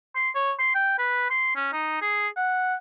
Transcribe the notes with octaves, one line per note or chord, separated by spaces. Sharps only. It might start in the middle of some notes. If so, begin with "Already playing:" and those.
C6
C#5
C6
G5
B4
C6
C#4
D#4
G#4
F#5